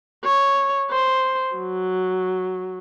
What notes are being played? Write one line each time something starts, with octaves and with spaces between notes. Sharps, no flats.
C#5
C5
F#3